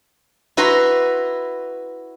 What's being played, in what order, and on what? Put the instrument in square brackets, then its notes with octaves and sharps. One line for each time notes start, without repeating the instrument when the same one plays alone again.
[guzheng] E4 F#4 B4 A#5 C6